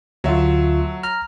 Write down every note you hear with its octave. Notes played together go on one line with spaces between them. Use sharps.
D2 F#3 A3 F4 E5
A#5 F6